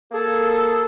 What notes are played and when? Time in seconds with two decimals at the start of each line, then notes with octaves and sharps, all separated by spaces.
0.12 A#3 G#4 A4